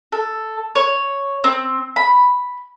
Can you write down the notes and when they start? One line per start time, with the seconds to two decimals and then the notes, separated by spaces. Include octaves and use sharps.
0.12 A4
0.75 C#5
1.44 C4
1.96 B5